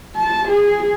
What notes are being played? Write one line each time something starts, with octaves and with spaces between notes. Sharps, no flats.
A5
G#4